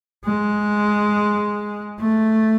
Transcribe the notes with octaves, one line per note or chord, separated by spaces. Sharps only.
G#3
A3